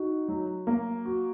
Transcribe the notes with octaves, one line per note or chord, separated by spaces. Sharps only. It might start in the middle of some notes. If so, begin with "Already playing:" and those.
Already playing: D#4 F#4
F#3
A#3
F#4